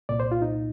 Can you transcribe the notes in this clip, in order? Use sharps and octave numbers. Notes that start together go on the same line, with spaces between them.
C2 A#2 D5
C5
F4
D#4